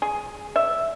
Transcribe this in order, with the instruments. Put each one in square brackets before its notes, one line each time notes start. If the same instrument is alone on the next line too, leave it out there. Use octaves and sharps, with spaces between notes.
[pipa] G#4
E5